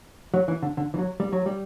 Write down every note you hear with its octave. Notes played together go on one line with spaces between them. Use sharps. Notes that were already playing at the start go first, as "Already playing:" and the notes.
F#3
E3
D3
D3
E3
F#3
G3
F#3
G3